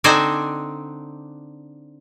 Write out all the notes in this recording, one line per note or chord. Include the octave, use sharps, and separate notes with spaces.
D3 C4 D4 D#4 C5 G#5